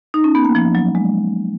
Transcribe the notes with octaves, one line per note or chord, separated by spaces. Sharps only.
D#4
C#4
B3
A#3
F3
F#3
G#3